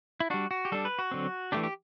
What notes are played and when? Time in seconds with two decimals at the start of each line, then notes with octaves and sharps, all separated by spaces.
0.20 E4
0.30 G3 D4 F#4
0.51 F#4
0.65 G4
0.72 G3 D4 A4
0.85 B4
0.99 F#4
1.11 D3 F#3 C4
1.52 E3 A3 D4 G4
1.63 G4